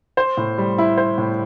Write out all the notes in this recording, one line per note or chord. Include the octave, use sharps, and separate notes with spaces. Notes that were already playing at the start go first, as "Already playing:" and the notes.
C5
A2
G3
E4
C5
A2